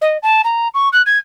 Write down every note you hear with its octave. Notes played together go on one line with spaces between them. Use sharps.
D#5
A5
A#5
C#6
F#6
G#6